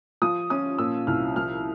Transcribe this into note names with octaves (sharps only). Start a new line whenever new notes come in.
F3 D#6
C#4 D#6
A#2 E6
C2 F6
F3 F6